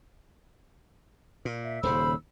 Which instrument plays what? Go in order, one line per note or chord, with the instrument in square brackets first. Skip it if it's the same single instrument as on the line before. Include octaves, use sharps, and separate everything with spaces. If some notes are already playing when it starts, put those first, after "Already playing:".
[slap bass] A#2
[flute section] E5
[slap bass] D#1 D#2 C#3 [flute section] C5 B5 E6